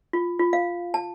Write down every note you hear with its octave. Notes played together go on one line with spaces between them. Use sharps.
F4
F4
F5
A5